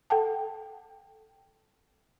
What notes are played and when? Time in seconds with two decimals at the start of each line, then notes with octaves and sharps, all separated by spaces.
0.10 A4 F#5 G5 A5